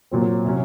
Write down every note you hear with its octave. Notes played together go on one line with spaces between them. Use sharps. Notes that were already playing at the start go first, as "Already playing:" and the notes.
A#2 F#3 C4
C3 F#3 C#4